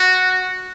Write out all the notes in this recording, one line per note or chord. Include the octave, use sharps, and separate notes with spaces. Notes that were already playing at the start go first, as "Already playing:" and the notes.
Already playing: F#4